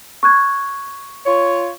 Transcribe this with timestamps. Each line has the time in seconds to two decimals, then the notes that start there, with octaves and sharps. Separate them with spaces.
0.23 C#6 F#6 G#6
1.26 F4 C#5